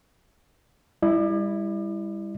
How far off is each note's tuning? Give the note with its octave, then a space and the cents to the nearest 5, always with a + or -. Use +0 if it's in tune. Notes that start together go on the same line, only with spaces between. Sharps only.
G3 +30 E4 +0 D5 +40